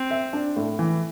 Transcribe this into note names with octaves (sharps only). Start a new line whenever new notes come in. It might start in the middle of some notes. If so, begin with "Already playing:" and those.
Already playing: C4
E5
D4
A2
E3